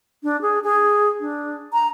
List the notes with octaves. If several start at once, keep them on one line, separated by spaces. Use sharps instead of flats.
D4
G#4
G#4
D4
A#5